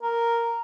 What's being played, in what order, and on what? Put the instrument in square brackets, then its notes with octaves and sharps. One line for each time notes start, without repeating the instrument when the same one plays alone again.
[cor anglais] A#4